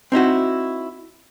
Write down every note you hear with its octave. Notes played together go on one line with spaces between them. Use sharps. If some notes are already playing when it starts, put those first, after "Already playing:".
C4 D#4 E4 F#4